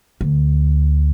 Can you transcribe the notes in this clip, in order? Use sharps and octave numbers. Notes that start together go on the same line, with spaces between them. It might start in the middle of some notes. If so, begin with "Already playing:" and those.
D2